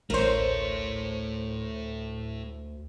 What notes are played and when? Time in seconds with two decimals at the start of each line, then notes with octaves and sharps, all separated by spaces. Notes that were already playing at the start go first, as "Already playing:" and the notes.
0.10 A1 D2 A3 E4 A#4 C5 C#5